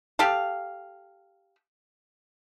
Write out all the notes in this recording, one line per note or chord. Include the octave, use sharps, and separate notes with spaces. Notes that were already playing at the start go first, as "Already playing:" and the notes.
G4 A4 F5